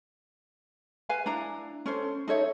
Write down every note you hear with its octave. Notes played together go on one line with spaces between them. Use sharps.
B4 F5 G#5
D4 E4 A#5
C#4 A4 C5
D#4 A4 C#5 E5